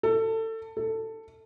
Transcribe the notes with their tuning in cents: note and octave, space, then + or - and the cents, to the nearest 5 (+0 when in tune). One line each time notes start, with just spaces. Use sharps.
A4 +25
A4 +15